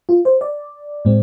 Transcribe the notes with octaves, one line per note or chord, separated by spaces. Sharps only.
F4
C5
D5
A2 G#3 C4